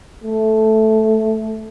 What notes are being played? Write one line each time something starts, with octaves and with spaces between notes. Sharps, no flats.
A3